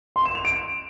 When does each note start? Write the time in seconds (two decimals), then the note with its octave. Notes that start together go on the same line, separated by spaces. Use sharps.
0.16 C6
0.25 E7
0.35 F7
0.45 D7